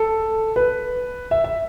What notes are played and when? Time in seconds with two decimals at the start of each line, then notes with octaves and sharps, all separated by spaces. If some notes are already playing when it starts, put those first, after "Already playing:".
Already playing: A4
0.56 B4
1.31 E5
1.44 E5